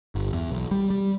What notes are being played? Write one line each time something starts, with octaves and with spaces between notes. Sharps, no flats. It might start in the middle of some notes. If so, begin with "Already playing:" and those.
G1
E2
B1
G3
G3